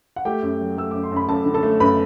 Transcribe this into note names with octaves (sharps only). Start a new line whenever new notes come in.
F#5
A3 G4 G5
F#2
F#3
A3 E6
F#2 D6
C6
F#2 B5
F#2 A4 A5
D3
A4 A5
A3
F#2 B4 B5